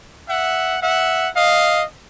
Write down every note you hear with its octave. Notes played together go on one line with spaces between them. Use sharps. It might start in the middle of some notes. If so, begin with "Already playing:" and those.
E5 F#5
E5 F#5
D#5 F5